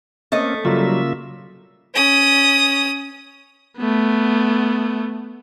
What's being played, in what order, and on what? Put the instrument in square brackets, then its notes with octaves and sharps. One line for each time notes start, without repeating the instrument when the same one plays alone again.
[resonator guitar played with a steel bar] A3 D#5 [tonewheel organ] A#3 C4 C#4
[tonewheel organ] C#3 A#3 E5 [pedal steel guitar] F#3 G3 [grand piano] F4
[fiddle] C#4 D#6
[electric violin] A3 B3